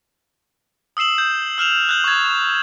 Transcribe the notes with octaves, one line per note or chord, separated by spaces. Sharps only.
D#6 E6 C7 E7 F#7
G6
E6 F6 E7 F7
F#6 G6 F#7
C#6 G#6